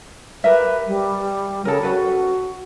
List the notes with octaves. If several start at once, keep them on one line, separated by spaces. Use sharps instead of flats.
G4 A#4 B4 E5
G3
C#3 A4 A#4
C#4 F#4 A4 B4